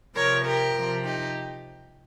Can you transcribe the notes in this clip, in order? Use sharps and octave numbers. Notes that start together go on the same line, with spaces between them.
C3 F3 A#4 C#5
G4 A#4
C3 F3
D#4 G4